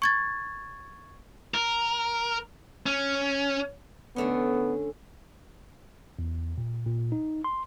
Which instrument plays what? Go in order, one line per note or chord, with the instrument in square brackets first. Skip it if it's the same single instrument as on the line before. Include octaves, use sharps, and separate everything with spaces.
[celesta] C#6 G#6 A6
[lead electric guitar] A#4
C#4
[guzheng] D3 A3 C#4 [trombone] B3
[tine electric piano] E2
A#2
A#2
D#4
C6